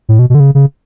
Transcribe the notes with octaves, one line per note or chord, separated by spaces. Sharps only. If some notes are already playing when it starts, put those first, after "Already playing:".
A2
B2
B2
D3
C#3
C#3